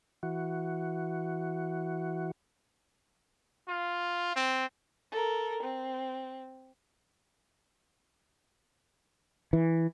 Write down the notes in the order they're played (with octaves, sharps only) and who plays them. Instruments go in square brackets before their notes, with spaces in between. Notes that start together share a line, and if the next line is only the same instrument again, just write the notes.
[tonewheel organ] E3 F#4
[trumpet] F4
C4
[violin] A4 A#4
C4
[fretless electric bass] E3